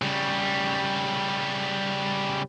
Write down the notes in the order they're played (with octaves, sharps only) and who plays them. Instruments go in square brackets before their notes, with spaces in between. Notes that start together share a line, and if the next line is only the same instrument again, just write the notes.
[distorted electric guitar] C#3 G3